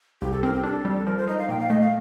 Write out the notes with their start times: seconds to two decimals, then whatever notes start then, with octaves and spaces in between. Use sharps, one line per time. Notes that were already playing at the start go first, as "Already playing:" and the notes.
0.21 C2 G4
0.32 A4
0.43 C4 A#4
0.53 G4
0.63 D4 A4
0.85 G3
1.06 F3 A#4
1.17 C5
1.28 D#4 D#5
1.38 F5
1.49 A#2 G5
1.59 F5
1.69 A3 D#5
1.81 F5